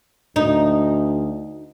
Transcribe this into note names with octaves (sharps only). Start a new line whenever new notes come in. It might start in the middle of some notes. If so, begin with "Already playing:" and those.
D2 D#4